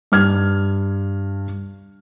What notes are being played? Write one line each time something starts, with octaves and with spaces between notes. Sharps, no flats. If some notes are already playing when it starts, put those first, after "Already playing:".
G2 F6 G#6